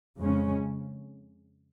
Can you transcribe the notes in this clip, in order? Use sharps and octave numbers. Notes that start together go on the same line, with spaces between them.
F2 C#3 G#3 C#4